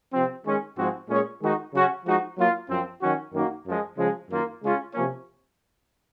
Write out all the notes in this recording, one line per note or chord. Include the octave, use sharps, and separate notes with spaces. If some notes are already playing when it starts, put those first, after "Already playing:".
C3 F3 C4
D#3 G#3 C#4
G#2 F3 G#3 C4 F#4
A#2 G#3 C#4 G#4 C#5
D#3 G#3 D#4 F#4
C#3 F#3 C#4 F#4
F3 G#3 D#4 F#4
F#3 A#3 F4
F#2 F3 C4
D#3 F#3 C#4 F#4
F#2 D#3 A#3 D#4 F#4
F#2 F3 G#3
C#3 F3 G#3
F#2 D#3 A#3 F4 A#4
C#3 G#3 C#4 F4
C3 F3 A#3 C#4